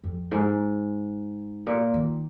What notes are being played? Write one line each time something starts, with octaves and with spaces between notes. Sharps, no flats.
F2
G#2
A#2
D#3